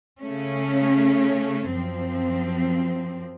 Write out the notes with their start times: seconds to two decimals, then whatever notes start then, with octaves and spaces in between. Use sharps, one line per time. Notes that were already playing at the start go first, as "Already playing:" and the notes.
0.20 C#3 A3 C#4
1.71 F#2 F3 C4